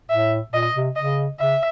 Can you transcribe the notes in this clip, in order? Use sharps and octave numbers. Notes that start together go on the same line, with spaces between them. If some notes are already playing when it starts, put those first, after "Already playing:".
A2 E5
A#2 D#5
C3
C#3 D#5
C#3 E5